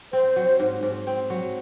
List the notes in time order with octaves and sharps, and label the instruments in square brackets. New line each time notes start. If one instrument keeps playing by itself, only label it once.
[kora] C4 [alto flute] C5
[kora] F#3
G#2
G#2
C4
F#3